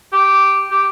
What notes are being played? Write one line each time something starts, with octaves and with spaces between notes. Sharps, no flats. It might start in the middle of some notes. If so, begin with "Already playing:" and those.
G4
G4